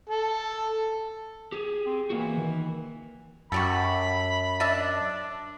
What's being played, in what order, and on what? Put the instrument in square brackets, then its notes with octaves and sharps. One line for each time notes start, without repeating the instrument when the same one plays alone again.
[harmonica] A4
[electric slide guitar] G4 G#4
[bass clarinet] C4
[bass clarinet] E3 [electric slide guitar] A#3 F#4
[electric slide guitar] D#3
[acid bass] F#2 [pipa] F#4 G4 A4 [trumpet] B5
[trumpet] D4 [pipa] D#5 E5 A5